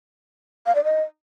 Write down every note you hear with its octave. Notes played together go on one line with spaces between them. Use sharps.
F5
D5
D#5